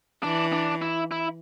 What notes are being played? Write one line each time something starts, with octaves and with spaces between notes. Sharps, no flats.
E3 D4
D4
E4
E4